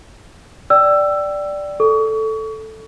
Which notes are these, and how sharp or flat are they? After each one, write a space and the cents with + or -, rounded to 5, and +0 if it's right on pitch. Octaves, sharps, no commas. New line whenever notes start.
D5 +0 G5 -15 E6 +15
A4 +0 C#6 +35